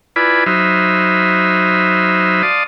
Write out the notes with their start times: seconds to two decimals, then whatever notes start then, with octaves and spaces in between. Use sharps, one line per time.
0.16 E4 F4 B4 D5 G#5 B5
0.46 F#3 D#4 C5 E5 B5 F6
2.43 D5 F5 A5 C6 D#6